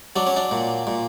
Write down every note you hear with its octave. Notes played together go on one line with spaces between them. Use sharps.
F#3 D4
C#4
D4
A#2
A#2